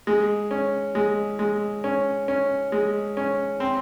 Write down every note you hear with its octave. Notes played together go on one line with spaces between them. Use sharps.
G#3
C#4
G#3
G#3
C#4
C#4
G#3
C#4
C4